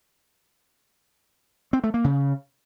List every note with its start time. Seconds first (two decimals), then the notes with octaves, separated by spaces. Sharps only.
1.73 C4
1.84 A3
1.94 A#3
2.04 C#3